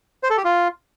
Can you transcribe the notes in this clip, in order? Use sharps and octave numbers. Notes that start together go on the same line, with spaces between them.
C5
A4
G4
F4